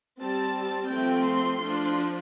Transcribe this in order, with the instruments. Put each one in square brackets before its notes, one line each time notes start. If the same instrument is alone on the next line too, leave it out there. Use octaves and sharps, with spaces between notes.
[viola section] G3 C4 A5
F3 A3 C4 G5
C6
F3 D4